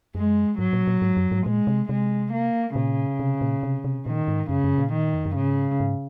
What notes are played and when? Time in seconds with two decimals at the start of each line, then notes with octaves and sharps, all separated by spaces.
0.15 F#2 G#3
0.59 G#2 F#3
0.73 A#2
0.87 A#2
1.02 G#2
1.17 F#2
1.31 G#2
1.46 A#2 G#3
1.67 C3
1.89 C3 G#3
2.32 A#3
2.76 A#2 C#3
3.19 C3
3.41 A#2
3.63 C3
3.84 C3
4.06 A#2 D#3
4.28 G#2
4.49 F#2 C#3
4.64 F#2
4.78 A#2
4.93 D#3
5.14 F2
5.25 F#2
5.36 G#2 C#3
5.80 G#2